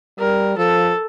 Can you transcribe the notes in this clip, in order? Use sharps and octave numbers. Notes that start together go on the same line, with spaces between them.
G3 A#4
F3 A4